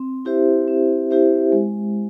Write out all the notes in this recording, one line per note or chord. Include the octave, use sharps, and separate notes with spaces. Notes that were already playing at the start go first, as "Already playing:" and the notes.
Already playing: C4
E4 G4 C5 E5
C4
E4 G4 C5 E5
G#3